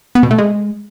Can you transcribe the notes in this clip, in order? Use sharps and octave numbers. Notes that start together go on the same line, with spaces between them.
B3
B2
A3
G#3